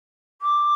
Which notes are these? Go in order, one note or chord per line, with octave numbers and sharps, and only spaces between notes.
D6